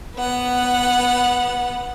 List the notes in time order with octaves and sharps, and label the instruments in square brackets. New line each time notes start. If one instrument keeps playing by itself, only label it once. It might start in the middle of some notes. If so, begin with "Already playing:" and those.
[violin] B3 F#5